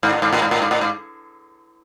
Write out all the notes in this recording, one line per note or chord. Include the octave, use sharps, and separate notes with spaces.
G#2
A2
G#2
A2
G#2
A2
G#2
A2
G#2